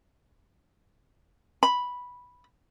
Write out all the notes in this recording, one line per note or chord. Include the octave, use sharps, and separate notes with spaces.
B5